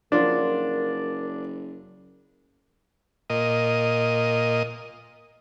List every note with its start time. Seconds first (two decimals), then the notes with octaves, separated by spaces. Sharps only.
0.12 F#1 F3 F#3 D4 F4 A#4
3.30 A#2 D#5